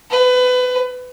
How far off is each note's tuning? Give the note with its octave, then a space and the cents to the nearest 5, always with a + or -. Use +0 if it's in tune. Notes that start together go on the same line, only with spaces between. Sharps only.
B4 +25